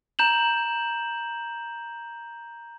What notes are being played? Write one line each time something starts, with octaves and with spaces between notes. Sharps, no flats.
A#5 G6 E7 F#7